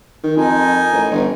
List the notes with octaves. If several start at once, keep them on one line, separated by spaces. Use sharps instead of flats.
D#3
F2 D#4 A#4 G#5
A1
G1